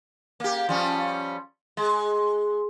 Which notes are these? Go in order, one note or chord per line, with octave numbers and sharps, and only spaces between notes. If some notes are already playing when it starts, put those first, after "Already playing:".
A#3 G4
F3 G3 C#4
G#3